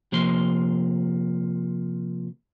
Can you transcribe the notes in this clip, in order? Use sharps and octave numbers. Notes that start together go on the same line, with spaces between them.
C3 F3 A#3 C6